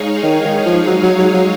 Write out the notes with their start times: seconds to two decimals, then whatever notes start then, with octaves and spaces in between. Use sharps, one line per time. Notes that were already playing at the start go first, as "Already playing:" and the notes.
Already playing: G#3 D#4 G#4 C#5 F5
0.23 D#3
0.45 D#3
0.66 F3
0.87 F#3
1.03 F#3
1.18 F#3
1.34 F#3